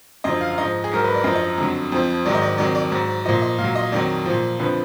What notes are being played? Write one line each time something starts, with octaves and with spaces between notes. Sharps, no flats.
F#2 D3 F3 D#5
F5
F5
G#2 F3 D#5
G#4
G#2 F#3 A#4
B4
D5
F#2 F3 D#5
D#5
F2 D3 F#3
F2 F3
G#2 D#3 F#3 D5
D#5
D5
F2 D#3 F#3 D5
D5
G#2 F#3
A#2 F3 D#5
D#5
A#2 F5
F#3
D#5
F2 D#3 F#3 D5
A#2 F3
F2 D3 F3 B4